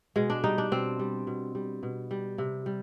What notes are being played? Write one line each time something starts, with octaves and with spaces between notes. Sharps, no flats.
B2 G#3
D4
G3 D#4
D4
B2 C4
G3
B2
G3
B2
G3
C3
G3